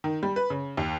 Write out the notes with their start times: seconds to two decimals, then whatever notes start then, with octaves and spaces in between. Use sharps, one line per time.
0.04 D#3
0.23 G3
0.36 B4
0.50 C#3
0.77 D#2